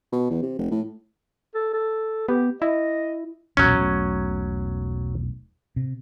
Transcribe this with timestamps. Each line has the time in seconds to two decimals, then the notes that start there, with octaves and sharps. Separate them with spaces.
0.12 B2
0.30 E2
0.43 C3
0.59 F1
0.71 A2
1.55 A4
1.73 A4
2.29 B3 G4
2.62 E4 D#5
3.57 B1 E2 A#2 F#3 C#4
3.79 E1 B1 A3
5.76 C3